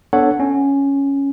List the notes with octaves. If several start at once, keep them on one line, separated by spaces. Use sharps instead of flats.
B3 D4 A4 C#5 F#5
C#4